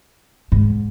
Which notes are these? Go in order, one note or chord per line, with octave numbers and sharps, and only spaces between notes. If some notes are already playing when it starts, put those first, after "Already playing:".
G#2